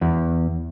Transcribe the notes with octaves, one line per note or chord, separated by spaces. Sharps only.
E2